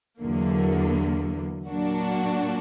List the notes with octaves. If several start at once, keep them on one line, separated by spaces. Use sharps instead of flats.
E2 D3 F#3 A#3
A#2 F#3 A#3 D4 F#4